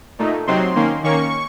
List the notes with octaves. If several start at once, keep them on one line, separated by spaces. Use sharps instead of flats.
A#2 A3 D#4
C3 F#3 C4 D#4 C6
D#3 A#3 C#4
D#3 A#3 C#4 C#6